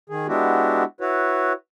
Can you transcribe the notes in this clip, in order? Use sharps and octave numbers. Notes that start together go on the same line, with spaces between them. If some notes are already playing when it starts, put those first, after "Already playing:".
D#3 G#4
G#3 B3 D4 E4 F#4 G4
E4 F#4 B4 C#5